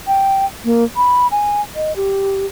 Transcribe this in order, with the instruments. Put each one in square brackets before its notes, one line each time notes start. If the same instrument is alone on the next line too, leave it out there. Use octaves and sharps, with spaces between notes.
[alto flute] G5
A#3
B5
G#5
D#5
G4